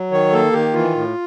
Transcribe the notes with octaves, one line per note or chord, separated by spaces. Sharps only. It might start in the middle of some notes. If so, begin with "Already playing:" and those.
Already playing: F#3
D#3 C#5
A#3 A4
D#3 G4
E3 F4
A2